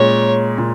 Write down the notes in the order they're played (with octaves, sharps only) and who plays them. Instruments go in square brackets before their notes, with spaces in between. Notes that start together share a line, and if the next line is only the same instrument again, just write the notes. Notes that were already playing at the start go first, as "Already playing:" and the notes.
Already playing: [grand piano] A#2 G#3 C#4 [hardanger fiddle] C#5
[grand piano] A#2